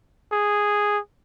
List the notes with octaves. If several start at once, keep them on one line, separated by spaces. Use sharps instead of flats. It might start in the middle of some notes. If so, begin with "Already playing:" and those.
G#4